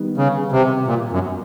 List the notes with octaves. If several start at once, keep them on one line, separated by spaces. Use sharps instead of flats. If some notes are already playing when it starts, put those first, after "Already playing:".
Already playing: D#3 G3 B3
C#3
C3
A#2
F#2